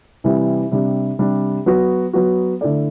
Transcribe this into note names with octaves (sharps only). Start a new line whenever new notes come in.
C3 E3 G3
C3 G3 D4
C3 G3 D4
F#3 B3 F#4
F#3 B3 F#4
D3 A3 E4 A4 D5